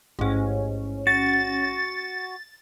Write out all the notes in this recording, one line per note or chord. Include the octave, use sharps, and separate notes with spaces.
A1 G#2 C#4
F#4 A6